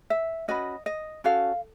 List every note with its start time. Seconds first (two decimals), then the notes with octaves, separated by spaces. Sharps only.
0.10 E5
0.48 C#4 F#4 B4 D#5
0.86 D#5
1.24 C#4 F#4 A4 F5